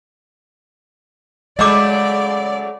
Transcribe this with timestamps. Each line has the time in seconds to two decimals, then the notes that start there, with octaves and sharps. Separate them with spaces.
1.59 C#3 F#3 G#3 A3 D5 D#5 D6